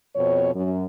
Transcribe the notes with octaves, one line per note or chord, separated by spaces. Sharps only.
F2 B2 C4 C#5
F#2